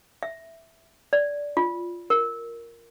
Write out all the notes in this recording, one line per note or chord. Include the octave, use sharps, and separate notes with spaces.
E5
D5
F4
A#4